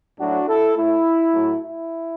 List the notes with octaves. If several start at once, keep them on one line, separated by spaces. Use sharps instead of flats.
A2 F#3 A3 D4 F#4
E4 A4
A2 A3 E4
A2 F#3 A3
E4